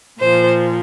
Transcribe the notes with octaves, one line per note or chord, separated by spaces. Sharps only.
A#2 F3 C5